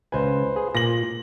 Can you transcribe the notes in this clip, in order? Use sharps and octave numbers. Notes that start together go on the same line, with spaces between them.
C#2 B4 C5 G#5
G#4
A#2 A#6 F#7